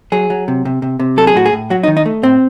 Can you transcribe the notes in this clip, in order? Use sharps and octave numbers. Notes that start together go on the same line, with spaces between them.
F#3 G#4
F#3
C3
C3
C3
C3
F#3 A4
G#4
A2 F#4
G#4
A2
F#3 F#4
D#4
D#3
D#4
A3
A2 C4